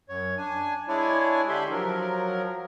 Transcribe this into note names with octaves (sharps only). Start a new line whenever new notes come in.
F#2 C#5
D4 G#5
G#3 D4 E4 C#5 D5 G#5
D3 G4 A4 E5 B5 C6
F3 F#3 A#4